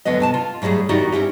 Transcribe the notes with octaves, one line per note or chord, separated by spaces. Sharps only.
D2 D3 F#3 B3 D#5
C3 G#5 A5
F4
A2 F#3 G3 F#4 G#4
D#3 D#4 E4 F#4 G4 D5
C4 C#4 E4 G4